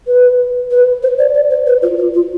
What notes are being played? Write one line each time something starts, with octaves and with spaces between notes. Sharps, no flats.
B4
B4
C5
D5
D5
C5
B4
F4
F4
F4